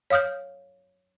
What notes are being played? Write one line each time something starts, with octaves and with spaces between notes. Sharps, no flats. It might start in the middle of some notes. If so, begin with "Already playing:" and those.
C#5 F5 D#6 F6 G6